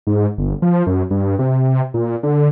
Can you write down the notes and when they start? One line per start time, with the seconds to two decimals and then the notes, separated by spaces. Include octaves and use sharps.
0.07 G#2
0.38 G1
0.62 F3
0.87 F#2
1.11 G2
1.39 C3
1.94 A#2
2.23 D3